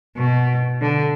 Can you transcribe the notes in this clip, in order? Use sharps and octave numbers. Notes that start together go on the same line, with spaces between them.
B2
D3